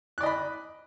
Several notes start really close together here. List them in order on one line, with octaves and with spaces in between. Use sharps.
F#6 D5 D#5 B5